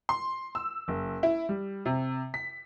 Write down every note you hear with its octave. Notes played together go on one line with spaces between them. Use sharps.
C6
E6
F#1
E4
G3
C3
B6